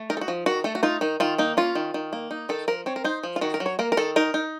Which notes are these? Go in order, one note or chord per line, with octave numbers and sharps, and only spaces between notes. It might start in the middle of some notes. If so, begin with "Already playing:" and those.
Already playing: A3
D#4 A#4
A4
F#4
F3
D#3 F#4
A3 A4
F#4
D#4 F4
D#3 D#4
D#3 F4
A#3 D#4
C#4 F4
D#3
D#3
A#3
D#4
D#3 A4
F3 A#4
C4 C#5
A#4
D#4 C5
F3
F4
D#3 F#4
A#4
F#3
C#5
A#3 A#4
A#4
D#3 A4
D#4 A#4
D#4